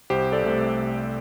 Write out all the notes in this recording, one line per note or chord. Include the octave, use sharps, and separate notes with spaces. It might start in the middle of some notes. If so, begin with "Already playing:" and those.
C2 G4 C5
A4 D5
C3 A3